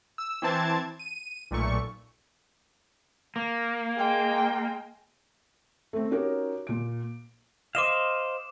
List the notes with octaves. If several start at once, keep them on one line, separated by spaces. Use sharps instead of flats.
E6
E3 C4 A5 G#6
D#7
B1 A#2 A3 C#6
A#3
G#3 G5
A3 C4
C#4 D#4 F#4 G4 A#4 C#5
A#2 D7
C5 D#5 F5 D6 E7